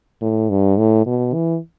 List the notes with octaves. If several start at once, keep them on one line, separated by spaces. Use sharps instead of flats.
A2
G2
A2
B2
E3